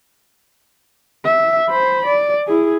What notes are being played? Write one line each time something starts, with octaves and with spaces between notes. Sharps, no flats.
E5
C5 B5
D5
E4 G#4